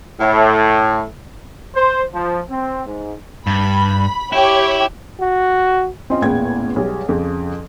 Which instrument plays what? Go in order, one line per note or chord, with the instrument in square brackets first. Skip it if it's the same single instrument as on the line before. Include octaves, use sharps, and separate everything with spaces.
[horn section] A2
[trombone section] C5
F3
C4
G#2
[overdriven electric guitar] G2 [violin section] B5
[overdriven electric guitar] E4 [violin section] G4 C#5
[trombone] F#4
[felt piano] C4 C#4 F4 D#5
A1 E2 A#2 B3 G5 G#6
B1 G3 G#3
F2 C#3 F3